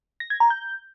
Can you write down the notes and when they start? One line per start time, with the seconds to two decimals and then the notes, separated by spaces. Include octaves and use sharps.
0.20 A#6
0.30 G#6
0.40 A#5
0.50 G6